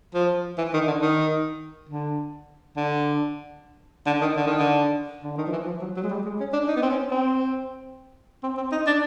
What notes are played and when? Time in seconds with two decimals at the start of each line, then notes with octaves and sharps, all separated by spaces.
0.14 F3
0.58 E3
0.74 D#3
0.87 D3
1.02 D#3
1.89 D3
2.76 D3
4.06 D3
4.22 D#3
4.36 D3
4.47 D#3
4.59 D3
5.24 D3
5.37 D#3
5.47 F3
5.52 E3
5.66 F3
5.81 F#3
5.96 F#3
6.04 G#3
6.10 G3
6.25 G#3
6.40 C#4
6.53 D4
6.68 D#4
6.76 B3
6.82 C4
6.91 C#4
7.11 C4
8.43 C4
8.57 C4
8.72 D#4
8.87 D4